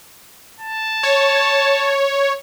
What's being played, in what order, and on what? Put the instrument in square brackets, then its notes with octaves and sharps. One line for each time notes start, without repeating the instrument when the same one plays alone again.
[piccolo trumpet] A5
[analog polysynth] C#5